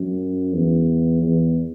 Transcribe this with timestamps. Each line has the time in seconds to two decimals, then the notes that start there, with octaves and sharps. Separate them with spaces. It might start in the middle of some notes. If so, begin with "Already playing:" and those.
Already playing: F#2
0.53 E2
1.22 E2